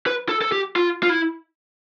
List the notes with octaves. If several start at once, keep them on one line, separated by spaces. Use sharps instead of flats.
B4
A4
A4
G4
F4
F4
E4